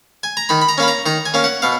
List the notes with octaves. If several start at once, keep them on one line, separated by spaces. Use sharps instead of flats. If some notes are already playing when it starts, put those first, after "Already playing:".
G#5
A#5
D#3 B5
B5
A#5
A#3 C#4 B5
A#5
D#3 A#5
G#5
A#3 C#4
F#5
B2 F5